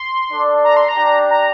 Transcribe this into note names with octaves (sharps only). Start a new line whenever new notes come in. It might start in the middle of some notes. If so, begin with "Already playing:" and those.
Already playing: C6
D4 A4 D5
A#5
C6
A#5
D4 G4 D5
A#5